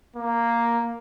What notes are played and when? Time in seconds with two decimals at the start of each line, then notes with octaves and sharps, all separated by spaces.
0.16 A#3